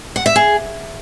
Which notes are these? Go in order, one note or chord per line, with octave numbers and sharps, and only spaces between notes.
F#5
E5
G#4